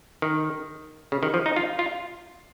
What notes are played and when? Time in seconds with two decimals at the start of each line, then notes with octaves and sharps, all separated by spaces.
0.22 D#3
1.12 C#3
1.23 D#3
1.34 F3
1.46 D#4
1.56 F4
1.79 F4